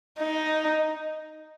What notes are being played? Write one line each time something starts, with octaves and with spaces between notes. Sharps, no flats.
D#4